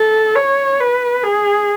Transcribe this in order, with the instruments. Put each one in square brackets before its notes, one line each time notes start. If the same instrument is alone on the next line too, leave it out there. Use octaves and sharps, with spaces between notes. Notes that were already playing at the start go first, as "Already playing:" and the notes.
Already playing: [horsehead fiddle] A4
C#5
B4
G#4